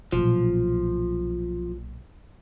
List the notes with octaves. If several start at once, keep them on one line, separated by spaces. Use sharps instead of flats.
B1 A#2 F3